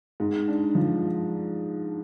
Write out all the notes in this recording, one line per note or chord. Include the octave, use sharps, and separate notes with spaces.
G#2
D4
F3